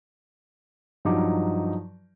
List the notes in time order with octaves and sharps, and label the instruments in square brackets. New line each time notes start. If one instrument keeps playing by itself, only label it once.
[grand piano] G2 F3 F#3 D#4 D6